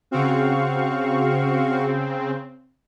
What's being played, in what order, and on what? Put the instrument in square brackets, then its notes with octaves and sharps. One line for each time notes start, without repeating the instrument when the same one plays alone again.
[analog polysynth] C#3 C4 [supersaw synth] F#4 F5 C#6